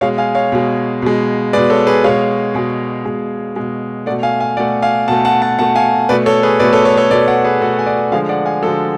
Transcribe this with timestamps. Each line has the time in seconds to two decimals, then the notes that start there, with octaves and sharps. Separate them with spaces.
0.01 B2 G#3 C#5 F5
0.18 F5 G#5
0.35 C#5 F5
0.52 B2 G#3
1.02 B2 G#3
1.53 B2 G#3 B4 D5
1.70 A4 C#5
1.87 G#4 B4
2.04 B2 G#3 C#5 F5
2.54 B2 G#3
3.05 B2 G#3
3.56 B2 G#3
4.06 A3 D5 F#5
4.10 B2
4.23 F5 G#5
4.40 F5 G#5
4.57 B2 A3 D5 F#5
4.82 F5 G#5
5.08 B2 A3 F#5 A5
5.25 F#5 A5
5.42 F#5 A5
5.59 B2 A3 F#5 A5
5.76 F5 G#5
6.09 B2 A3 B4 D5
6.26 A4 C#5
6.43 G#4 B4
6.60 B2 B4 D5
6.64 A3
6.73 A4 C#5
6.85 A4 C#5
6.97 A4 C#5
7.10 B2 A3 B4 D5
7.27 D5 F#5
7.45 G#4 B4
7.61 B2 A3 F#4 A4
7.79 G#5
7.86 D5 F#5
8.11 D3 F3 G#3 F5 G#5
8.29 D5 F#5
8.45 F5 G#5
8.62 D3 F3 G#3 F#4 A4